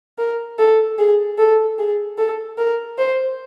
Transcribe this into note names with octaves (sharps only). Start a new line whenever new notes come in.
A#4
A4
G#4
A4
G#4
A4
A#4
C5